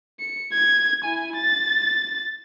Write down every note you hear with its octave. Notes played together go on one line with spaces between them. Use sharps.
C#7
G#6
E4 G#5
A6